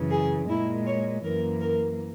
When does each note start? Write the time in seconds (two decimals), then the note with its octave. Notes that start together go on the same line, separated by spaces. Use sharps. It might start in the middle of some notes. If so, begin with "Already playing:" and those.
Already playing: F#2 C#3 E3
0.10 G#4
0.48 A#2 G#3 E4
0.86 C#5
1.23 F#2 E3 A#3 A#4
1.61 A#4